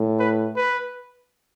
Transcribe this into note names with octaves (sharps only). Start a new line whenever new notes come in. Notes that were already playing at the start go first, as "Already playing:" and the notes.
Already playing: A2
B4
B4